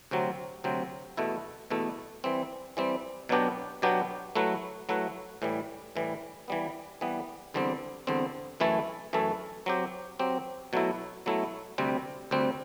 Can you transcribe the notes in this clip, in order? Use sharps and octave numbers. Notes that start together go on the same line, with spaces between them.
D2 C3 F#3 C4
D2 C3 F#3 C4
E2 B2 A3 E4
E2 B2 A3 E4
E3 G3 C4
E3 G3 C4
B2 F#3 B3 D4 G4
B2 F#3 B3 D4 G4
F#3 A3 E4 B4
F#3 A3 E4 B4
A2 E3 G3
A2 E3 G3
E3 G3 B3
E3 G3 B3
E2 D3 G3 C4
E2 D3 G3 C4
F#2 E3 A3 E4 A4
F#2 E3 A3 E4 A4
F#3 C4 G4
F#3 C4 G4
B2 F#3 A3 E4
B2 F#3 A3 E4
D2 C3 G3 C4
D2 C3 G3 C4